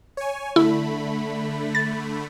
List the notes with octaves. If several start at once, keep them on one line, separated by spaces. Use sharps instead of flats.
C#5 G#5
D3 A3 E4 B5
A6